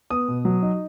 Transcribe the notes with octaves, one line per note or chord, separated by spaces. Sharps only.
B3 D#6
B2
F#3
D#4